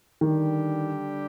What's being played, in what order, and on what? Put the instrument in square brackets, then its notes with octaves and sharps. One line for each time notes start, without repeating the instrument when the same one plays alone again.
[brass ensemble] D3 G3 D4 G4 [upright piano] D#3